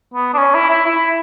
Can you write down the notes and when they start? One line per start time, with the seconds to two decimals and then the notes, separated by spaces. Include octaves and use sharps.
0.14 B3
0.34 D4
0.38 C#4
0.55 E4
0.70 E4
0.86 E4